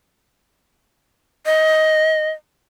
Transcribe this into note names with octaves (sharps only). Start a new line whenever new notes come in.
D#5